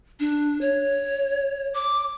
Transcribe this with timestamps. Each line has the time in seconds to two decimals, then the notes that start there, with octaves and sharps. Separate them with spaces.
0.20 D4
0.61 C#5
1.74 D6